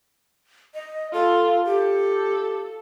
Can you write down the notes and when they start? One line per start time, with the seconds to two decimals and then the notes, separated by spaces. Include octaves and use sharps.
0.74 D#5
1.13 F4 A4
1.65 G4 A4